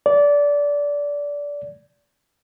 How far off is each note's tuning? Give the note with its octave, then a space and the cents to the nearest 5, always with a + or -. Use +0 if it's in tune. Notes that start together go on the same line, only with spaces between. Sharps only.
D5 -20